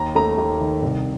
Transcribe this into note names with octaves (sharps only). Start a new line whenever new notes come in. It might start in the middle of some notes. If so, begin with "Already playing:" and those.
Already playing: D#2 A#5
A3 A#5
D#2
D#3
C2